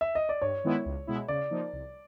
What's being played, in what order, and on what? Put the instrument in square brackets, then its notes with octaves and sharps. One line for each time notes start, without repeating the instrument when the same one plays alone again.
[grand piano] E5
D#5
D5
[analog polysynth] G2 [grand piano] C#5
[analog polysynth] D#3 G#3 B3 E4
C#2
B2 G#3 B3 E4
[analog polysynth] C#3 [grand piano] D5
[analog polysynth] F3 A#3 D#4
C2